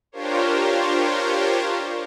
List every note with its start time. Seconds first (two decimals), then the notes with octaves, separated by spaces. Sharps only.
0.12 D4 F4 G4 A#4 C5 C#5